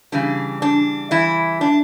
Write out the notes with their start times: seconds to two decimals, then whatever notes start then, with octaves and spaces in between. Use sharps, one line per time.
0.12 C#3 E3 G3 D4
0.62 D4
1.11 E3 E4
1.61 D4